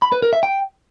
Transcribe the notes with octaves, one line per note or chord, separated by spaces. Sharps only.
B5
B4
A#4
E5
G5